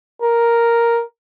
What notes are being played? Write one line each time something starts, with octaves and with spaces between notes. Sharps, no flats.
A#4